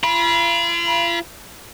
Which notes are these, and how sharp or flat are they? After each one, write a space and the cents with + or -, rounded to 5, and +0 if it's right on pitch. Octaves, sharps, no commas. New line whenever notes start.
F4 -40 B5 -30